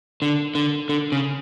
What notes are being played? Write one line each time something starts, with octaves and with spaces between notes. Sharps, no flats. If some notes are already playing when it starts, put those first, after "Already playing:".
D3
D3
D3
C#3